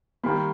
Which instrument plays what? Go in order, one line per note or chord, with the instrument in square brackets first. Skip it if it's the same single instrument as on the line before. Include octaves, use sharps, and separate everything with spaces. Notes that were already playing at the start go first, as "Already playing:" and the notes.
[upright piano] D#3 G3 A#3 B5